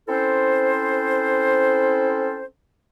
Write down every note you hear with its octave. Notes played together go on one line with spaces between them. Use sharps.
C4 C#4 E4 A4 C5